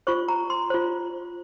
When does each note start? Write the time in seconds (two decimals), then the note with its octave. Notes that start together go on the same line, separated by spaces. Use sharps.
0.07 F4 C5 C#6
0.28 A#5
0.50 C6
0.70 F4 C5